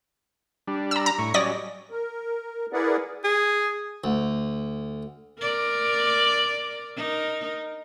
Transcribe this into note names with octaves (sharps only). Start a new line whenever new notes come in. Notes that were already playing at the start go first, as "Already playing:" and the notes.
G3 D4
A#5 E6
A#5
A2 C#6
F#3 G3 C#4 D5 D#5 A#6
A#4
E4 G#4 A#4 B4 D5 F#5
G#4
D2
A#4 D5
D#4 A#4